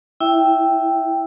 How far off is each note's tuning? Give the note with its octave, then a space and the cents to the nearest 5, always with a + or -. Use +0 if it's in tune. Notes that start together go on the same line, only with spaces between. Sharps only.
E4 +0 E5 +0 G5 +0